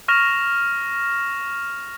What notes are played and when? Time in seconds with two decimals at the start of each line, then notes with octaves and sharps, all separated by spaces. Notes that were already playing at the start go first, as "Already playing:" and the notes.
0.08 C#6 F6 A#6 E7 F7